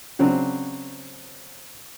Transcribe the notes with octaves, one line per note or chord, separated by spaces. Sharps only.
C#3 F#3 C4 D4